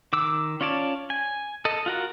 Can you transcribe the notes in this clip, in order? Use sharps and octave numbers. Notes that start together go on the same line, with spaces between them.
D#3 D6 E6
C#4 F4 C#5 D5 A5
G#5
A4 D#5
F4 F#4 A#4